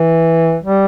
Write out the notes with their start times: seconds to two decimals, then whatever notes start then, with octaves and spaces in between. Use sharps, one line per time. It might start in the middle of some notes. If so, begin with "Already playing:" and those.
Already playing: E3
0.64 G3